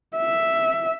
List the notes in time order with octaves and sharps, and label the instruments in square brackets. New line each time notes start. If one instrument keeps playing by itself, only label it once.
[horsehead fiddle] E5